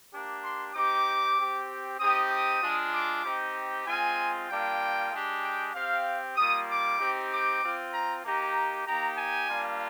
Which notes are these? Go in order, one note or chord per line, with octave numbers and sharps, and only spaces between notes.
A#3 D4 G4
C6
C4 D#4 G4 D6
C4 G4
C4 D#4 G4 D#6
D#6
G#3 D4 F4
D6
C4 D#4 G4
G#3 C4 F4 G#5
G3 A#3 D4 F4 G5
G#3 D4 G4
G5
C4 G4 F5
G3 A#3 F4 D#6
D6
C4 D#4 G4
D6
C4 F4
A#5
A#3 D#4 G4 A#5
A#3 D#4 G4 A#5
G#5
G3 A#3 D4 F4